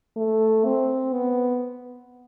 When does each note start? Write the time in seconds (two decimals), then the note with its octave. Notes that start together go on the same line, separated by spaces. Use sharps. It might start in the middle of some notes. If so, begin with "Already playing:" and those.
0.16 A3
0.65 C4
1.13 B3